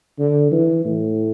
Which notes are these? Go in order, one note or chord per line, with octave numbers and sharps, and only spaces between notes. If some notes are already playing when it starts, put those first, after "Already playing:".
D3
E3
A2